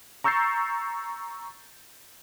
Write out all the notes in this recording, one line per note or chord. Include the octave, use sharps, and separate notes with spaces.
A#5 C#6 E6 G6 A6 C7